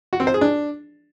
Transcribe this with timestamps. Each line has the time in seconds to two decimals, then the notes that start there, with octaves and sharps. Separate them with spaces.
0.13 F#4
0.20 C4
0.27 C5
0.34 G#4
0.41 D4